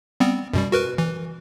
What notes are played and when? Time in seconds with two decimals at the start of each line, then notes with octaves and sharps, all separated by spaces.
0.20 G3 B3 C4
0.53 F#2 B2 G3
0.72 F#4 A#4 B4
0.98 E3